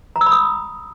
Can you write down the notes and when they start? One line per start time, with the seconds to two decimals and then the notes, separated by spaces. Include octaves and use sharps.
0.16 A#5
0.21 E6
0.26 B5
0.32 D#6